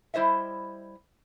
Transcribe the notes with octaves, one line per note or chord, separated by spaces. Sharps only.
G3 E4 C5 D#5 E5